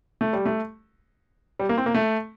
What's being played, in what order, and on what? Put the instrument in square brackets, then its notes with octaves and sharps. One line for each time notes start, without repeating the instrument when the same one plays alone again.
[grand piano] A3
G3
A3
G3
A#3
C4
A#3
A3